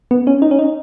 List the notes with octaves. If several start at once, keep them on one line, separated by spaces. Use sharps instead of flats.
B3
C#4
D#4
C#4
D#4